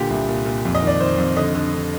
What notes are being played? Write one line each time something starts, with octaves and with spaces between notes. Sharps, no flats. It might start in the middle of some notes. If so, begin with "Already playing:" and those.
Already playing: A#2 D3 G4
C2
A#2
A#2
F2
D#5
D#3
D5
D#3 C5
F2
D3 D#5
D3
D3